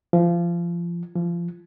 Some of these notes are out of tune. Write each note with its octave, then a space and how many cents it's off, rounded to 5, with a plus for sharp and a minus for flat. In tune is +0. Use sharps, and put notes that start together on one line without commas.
F3 -25
F3 -25